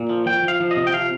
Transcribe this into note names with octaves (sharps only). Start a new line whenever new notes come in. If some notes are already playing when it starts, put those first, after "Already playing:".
Already playing: A#2
F3
F3 G5
F3
F5
F3
D#5
C3
G5
F3 F5